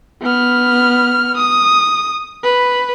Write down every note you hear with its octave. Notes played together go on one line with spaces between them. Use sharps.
B3 F6
D#6
B4